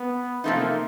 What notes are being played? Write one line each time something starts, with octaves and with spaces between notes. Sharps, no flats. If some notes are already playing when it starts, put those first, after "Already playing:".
Already playing: B3
C3 F3 A3 A#3 C4 D#4